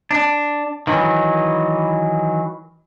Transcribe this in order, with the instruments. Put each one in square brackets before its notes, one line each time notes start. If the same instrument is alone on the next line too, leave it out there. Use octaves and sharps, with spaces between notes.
[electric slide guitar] D4
D#3 E3 F#3